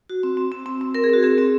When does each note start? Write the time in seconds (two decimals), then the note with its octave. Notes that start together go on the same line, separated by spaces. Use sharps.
0.10 F#4
0.23 C4
0.37 C4
0.52 C4
0.66 C4
0.81 C4
0.94 C4 A#4
1.04 G#4
1.09 C4 F#4
1.23 C4 G#4
1.38 C4